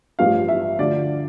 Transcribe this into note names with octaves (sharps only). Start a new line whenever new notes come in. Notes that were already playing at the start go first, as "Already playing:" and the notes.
A1 G2 F3 F5
E5
D2 D3 F3 D5